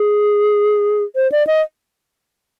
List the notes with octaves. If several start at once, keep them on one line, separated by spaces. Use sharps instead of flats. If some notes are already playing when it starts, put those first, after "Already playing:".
Already playing: G#4
C5
D5
D#5